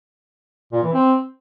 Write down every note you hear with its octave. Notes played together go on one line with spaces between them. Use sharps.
A#2
E3
C4